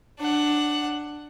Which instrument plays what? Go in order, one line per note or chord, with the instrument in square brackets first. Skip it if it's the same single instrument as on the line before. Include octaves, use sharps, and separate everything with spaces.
[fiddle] D4 F#5